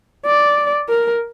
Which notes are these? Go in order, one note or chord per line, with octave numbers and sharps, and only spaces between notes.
D5
A#4